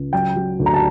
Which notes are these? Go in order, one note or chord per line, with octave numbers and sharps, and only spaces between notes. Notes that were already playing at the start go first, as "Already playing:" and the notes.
Already playing: C#2
F#3 G5
F#3
D2
A#5
A5